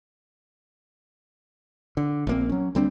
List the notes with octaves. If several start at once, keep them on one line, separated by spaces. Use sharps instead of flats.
D3
A#1 A#3 C4
F#3 C#4
D2 G3 C4 D4